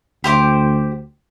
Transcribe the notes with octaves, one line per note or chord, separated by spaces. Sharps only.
D2 G4 C5 D6